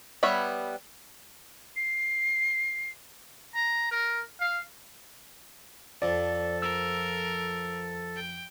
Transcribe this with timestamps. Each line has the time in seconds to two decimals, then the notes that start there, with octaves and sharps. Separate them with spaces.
0.23 G3 B3 C#5 E5 B5
1.76 C7
3.55 A#5
3.91 A#4
4.40 F5
6.02 F2 A4 D5
6.62 A#4 E6
8.16 G5